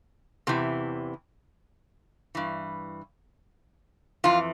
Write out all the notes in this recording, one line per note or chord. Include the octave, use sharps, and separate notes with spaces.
E2 C3 E3
G2 E3
F2 E3 F4